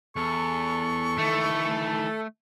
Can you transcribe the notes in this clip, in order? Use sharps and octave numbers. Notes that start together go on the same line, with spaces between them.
E2 A4 C#6
D#3 E3 A3